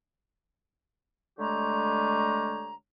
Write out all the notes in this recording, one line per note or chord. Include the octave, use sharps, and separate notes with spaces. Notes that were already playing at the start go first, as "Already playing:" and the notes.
D3 G#3 A3 G4 C#5 A#5